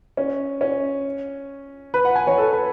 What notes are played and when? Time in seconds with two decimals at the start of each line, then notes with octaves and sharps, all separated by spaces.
0.17 C#4
0.61 C#4
1.94 B4
2.05 F#5
2.16 G#5
2.27 C#5
2.38 A4
2.53 B4